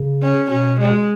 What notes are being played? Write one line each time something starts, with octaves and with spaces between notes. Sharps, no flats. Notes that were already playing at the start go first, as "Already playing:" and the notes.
Already playing: C#3
C#4
B2 C#4
G#3